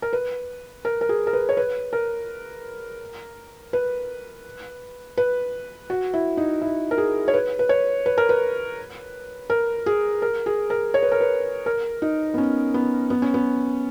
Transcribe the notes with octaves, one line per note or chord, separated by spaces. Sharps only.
A#4
B4
A#4
A#4
G#4
A#4
B4
C#5
B4
A#4
B4
B4
F#4
E4
D#4
E4
A#4
G#4
C#5
B4
B4
C#5
B4
A#4
B4
A#4
G#4
A#4
G#4
A#4
C#5
B4
A#4
B4
A#4
D#4
B3
C#4
B3
B3
C#4
B3